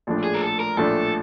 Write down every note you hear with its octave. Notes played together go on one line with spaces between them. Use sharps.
A#1 A2 F3 A3 D4
G#4
A#4
A4
A#4
A#1 A2 F3 A3 D4 A4